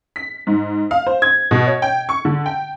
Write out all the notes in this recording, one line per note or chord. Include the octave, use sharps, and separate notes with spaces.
B6
G#2
F5
C5
G#6
B2
C#5
G5
C#6
D3
G5